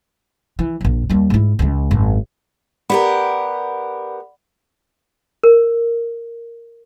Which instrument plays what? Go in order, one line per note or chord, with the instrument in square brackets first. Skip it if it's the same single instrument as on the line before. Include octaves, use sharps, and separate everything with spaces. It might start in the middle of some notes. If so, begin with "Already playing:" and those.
[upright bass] E3
A#1 F2
D#2 G3
G#2 E4
C#2 G#3
G#1 F#2
[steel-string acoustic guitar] B3 G4 A#4 [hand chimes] D5 F#5 B5
[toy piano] A#4